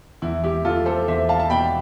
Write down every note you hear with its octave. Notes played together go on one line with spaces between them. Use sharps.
E2 E4
E4 G4
E2 F4 A4
A4 C5
E2 C5 E5
F5 A5
A5
B2 G5 B5